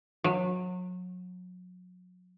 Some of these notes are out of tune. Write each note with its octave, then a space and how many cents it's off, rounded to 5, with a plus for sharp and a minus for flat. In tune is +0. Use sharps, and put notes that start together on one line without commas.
F#3 -30